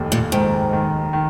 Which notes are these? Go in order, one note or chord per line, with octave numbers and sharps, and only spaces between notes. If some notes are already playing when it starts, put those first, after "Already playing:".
Already playing: F1 D#2
A#2
G#2 D#3
D#3
D#3